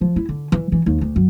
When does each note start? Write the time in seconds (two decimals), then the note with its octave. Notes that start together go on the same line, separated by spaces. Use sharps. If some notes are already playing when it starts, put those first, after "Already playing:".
0.01 F3
0.16 E4
0.29 D3
0.52 E3
0.72 E3
0.86 D#2
1.01 D2
1.16 F#2